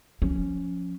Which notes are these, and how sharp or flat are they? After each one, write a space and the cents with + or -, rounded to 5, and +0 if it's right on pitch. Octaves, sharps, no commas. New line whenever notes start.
F3 +25 C#4 +0